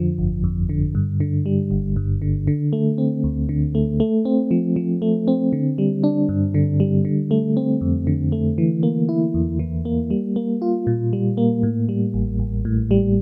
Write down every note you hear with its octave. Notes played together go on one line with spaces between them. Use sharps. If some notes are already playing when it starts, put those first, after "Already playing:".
Already playing: F2 D3 F3
G1
F2
D3
G2
D3
G3
G1
G2
D3
D3
A3
C4
D2
D3
A3
A3
C4
F3
F3
A3
C4
D3
G3
D4
G2
D3
G3
D3
A3
C4
F2
D3
A3
E3
A#3
E4
E2
E3
A#3
G3
A#3
F4
A#2
G3
A#3
A2
G3
A1
A1
A2
G3